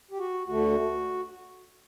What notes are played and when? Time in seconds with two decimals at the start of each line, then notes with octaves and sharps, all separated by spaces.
0.11 G4
0.19 F#4
0.46 D2 D3 A3 F#4